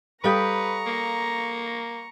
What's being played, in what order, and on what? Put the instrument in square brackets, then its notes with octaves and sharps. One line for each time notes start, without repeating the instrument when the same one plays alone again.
[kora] G3 G5 [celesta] A4 F5 D#6 [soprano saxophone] B4 [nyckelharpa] A#5 C#6
[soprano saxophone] A#3